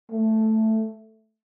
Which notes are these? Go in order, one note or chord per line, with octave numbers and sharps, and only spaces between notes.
A3